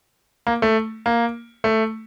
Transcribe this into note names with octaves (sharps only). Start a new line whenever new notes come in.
A#3
A3
A#3
A3